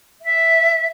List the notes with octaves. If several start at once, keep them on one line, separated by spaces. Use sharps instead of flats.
E5